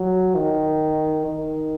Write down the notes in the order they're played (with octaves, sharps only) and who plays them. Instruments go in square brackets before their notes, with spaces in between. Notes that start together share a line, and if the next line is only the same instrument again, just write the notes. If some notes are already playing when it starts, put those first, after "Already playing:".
Already playing: [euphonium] F#3
D#3
D#3